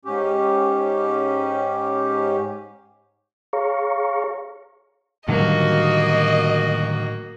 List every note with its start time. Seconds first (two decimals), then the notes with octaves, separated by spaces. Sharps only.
0.05 G#2 C#4 G4
3.53 G#4 C#5 F5 A#5 C#6
5.28 A2 D3 D#3 F#3 G3 A#3 F#4 D#5